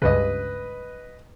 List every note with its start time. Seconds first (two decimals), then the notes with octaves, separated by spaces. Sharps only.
0.02 C#2 G2 C#3 B4 D#5